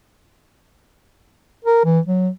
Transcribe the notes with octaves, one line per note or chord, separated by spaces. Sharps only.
A#4
E3
F#3